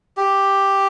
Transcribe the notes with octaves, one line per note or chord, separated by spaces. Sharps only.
G4